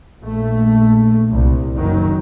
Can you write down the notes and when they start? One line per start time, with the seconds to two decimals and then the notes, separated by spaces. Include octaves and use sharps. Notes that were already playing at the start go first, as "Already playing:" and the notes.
0.20 A#1 A3
1.31 C2
1.74 F#1 D#3 F#3